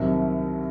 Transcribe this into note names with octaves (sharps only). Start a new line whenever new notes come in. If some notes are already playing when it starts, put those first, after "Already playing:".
Already playing: C2 C3 D#3 F#3